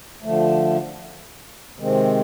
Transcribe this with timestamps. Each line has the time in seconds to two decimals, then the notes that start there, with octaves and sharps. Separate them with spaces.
0.22 D3 F3 A3
1.79 C3 D#3 G#3 C4